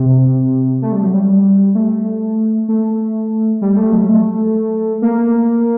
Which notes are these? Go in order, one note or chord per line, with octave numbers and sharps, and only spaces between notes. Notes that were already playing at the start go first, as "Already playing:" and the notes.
Already playing: C3
A3
G3
F#3
G3
A3
A3
G3
A3
F#3
A3
A#3